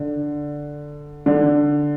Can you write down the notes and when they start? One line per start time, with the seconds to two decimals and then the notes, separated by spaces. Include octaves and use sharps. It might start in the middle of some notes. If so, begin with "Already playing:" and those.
Already playing: D3
1.26 D3